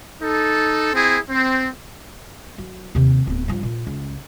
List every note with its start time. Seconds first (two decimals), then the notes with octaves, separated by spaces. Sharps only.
0.21 D#4 A4
0.93 C4 E4 G#4
1.29 C4
2.58 F#3
2.95 D#2 C3
3.27 D1 B3
3.48 G2 F3
3.63 A#2
3.87 C#2